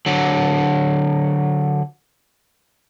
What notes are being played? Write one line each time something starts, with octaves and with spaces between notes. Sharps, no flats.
D3 F#3